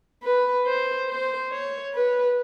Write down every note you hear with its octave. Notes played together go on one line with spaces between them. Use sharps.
B4
C5
C5
C#5
B4